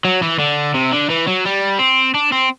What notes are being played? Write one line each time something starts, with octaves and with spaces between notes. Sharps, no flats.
F#3
E3
D3
C3
D3
E3
F#3
G3
C4
D4
C4